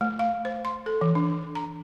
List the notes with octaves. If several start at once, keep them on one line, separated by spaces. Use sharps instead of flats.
A3
F5
C5
C6
A4
E3
D4
A#5